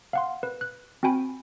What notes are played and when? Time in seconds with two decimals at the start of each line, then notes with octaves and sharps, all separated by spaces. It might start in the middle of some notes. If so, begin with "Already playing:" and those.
0.13 F5 F#5 C6
0.43 B4
0.61 F#6
1.03 C4 F#4 G5 G#5 B5